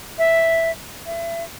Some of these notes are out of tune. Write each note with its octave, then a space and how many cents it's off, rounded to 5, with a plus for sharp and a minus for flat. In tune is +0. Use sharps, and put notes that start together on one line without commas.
E5 +0
E5 +30